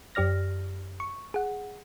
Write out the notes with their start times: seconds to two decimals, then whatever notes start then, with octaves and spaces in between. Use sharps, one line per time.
0.15 F#2 G4 D5 F6 A#6
1.00 C#6
1.34 G#4 F#5